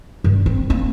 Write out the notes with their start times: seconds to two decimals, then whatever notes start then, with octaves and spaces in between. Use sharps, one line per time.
0.24 G2
0.46 C4
0.70 A#3 C4